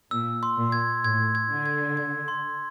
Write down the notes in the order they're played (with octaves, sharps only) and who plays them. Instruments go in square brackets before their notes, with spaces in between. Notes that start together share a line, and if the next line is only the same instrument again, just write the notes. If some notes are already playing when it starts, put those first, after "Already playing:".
[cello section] A#2 [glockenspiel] E6
[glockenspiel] C6
[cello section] A#2
[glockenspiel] G#6
[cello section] A2 [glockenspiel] G#6
[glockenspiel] G#6
[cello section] D3
[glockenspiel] G#6
G#6
C6